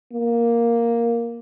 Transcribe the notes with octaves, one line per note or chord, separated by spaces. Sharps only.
A#3